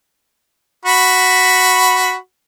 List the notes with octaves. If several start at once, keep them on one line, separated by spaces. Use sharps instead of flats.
F#4 B5